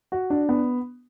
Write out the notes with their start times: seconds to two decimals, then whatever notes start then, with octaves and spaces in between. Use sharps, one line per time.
0.12 F#4
0.30 D4
0.49 B3